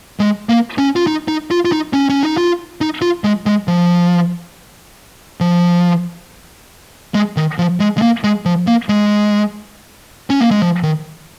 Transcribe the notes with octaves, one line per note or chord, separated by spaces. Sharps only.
G#3
A#3
C#4
F4
D#4
D#4
F4
F4
D#4
C#4
C#4
D#4
F4
D#4
F4
G#3
G#3
F3
F3
G#3
D#3
F3
G#3
G#3
A#3
G#3
F3
A#3
G#3
C#4
A#3
G#3
F3
D#3